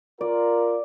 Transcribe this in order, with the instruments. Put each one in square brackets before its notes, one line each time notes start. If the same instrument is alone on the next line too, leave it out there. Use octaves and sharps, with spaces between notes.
[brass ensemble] F4 A#4 [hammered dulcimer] D5